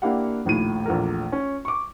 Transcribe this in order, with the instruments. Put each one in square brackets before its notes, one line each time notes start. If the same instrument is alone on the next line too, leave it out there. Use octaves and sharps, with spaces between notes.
[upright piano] A#3 D4 E4 G4 F5 F#5
A#1 D#2 A2 D#7
A#1 E2 A3 A#4
C#4
C#6 D6